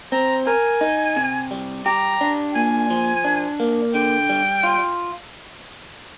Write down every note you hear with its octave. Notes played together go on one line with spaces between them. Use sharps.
C4 A#5
A#4 G#5
D#4
C3
G3
G4 A#5
D4
A#2 G#5
F3
D4
A#3
D3 G5
G3
F4